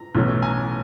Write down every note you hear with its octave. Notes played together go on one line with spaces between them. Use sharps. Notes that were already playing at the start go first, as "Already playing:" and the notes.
Already playing: A#5
B1 A2 E3 A3 C#4
G#5 A#5